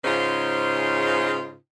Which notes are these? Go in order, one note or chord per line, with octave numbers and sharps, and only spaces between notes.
G#2 C#3 D#4 F4 C5 C#5